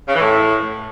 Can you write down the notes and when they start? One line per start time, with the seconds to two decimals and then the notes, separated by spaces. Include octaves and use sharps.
0.08 C#3
0.14 E3
0.21 A2